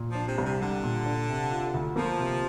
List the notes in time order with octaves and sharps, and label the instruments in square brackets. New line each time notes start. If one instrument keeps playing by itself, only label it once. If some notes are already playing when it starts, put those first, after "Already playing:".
Already playing: [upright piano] A#2
[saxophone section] F3 [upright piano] D4
[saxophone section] C3
[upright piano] C2
[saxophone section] C3
[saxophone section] D3 [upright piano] G3
[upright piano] A#2
D4
C3
F4
D2
[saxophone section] F3 [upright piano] A#3
[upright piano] C3